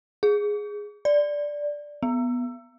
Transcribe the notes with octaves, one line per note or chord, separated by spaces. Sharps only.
G#4
D5
B3